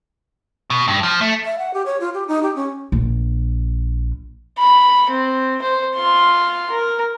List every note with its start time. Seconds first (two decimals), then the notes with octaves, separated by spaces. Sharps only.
0.70 B2
0.88 G2
1.03 F3
1.21 A3
1.45 E5
1.59 F#5
1.74 G4
1.86 C#5
2.00 F4
2.14 G4
2.28 D#4
2.43 G4
2.56 C#4
2.92 A#1
4.58 B5
5.10 C4
5.62 C5
5.96 F4 C6
6.70 A#4